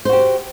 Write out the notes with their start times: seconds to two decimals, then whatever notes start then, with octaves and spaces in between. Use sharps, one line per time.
0.05 C5
0.09 F#4
0.13 G4